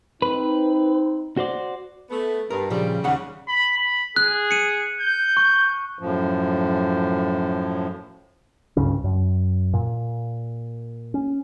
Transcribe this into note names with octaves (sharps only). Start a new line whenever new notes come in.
C4 D#4 B4
F#4 C5 D5
A3 B3
G2 A#4
A#2 C#3 F3 G3
D#2 C#3 G3 F#5
B5
B5
G#4 F#6
C#7 D#7
G6
C#6
F#2 A2 F3
C#2 G2 C#3 C#4
F#2
A#2
C#4